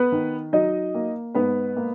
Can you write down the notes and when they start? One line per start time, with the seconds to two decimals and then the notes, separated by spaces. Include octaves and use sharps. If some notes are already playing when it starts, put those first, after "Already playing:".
Already playing: B3 B4
0.12 D#3
0.53 F#3 D#4 D#5
0.95 A#3
1.34 G#2 B3 B4
1.76 A#3